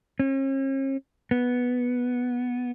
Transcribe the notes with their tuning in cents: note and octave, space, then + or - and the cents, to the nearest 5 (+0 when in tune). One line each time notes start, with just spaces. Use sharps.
C#4 -45
B3 -5